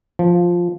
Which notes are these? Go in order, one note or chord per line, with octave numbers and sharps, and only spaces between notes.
F3